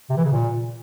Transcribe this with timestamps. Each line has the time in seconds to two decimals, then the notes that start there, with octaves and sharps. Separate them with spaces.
0.10 C3
0.17 E3
0.25 C#3
0.32 A#2